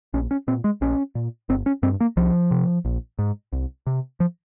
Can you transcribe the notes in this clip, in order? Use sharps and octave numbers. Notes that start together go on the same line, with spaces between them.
A#1 C#4
C#4
A#2 C4
G#3
A#1 C#4
A#2
G1 C4
C#4
G2 C4
A#3
C2 F3
C3
A#1
G#2
C2
C3
F3